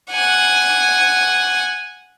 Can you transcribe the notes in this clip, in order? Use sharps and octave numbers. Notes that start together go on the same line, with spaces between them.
F#5 G#5